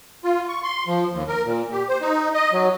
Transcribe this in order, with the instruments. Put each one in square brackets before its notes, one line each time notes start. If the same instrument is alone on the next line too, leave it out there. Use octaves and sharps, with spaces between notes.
[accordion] F4
C#6
C6
F3
D#2
A#4
A#2
G4
C5
D#4
D#5
F#3